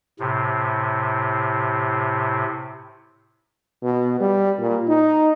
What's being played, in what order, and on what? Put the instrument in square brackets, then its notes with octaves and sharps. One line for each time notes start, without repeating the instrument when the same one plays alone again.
[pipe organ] A2 C3
[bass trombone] B2
G3
A#2
D#4